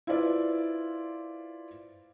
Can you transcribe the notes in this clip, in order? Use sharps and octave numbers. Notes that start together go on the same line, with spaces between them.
E4 F4 B4 C5 D5